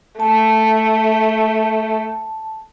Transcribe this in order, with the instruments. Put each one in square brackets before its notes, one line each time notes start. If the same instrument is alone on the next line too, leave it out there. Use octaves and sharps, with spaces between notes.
[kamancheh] A3 [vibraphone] A5